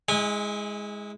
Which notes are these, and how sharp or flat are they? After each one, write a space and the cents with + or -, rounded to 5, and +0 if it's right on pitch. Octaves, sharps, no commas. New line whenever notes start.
G#3 +0 E4 -35 G#5 -25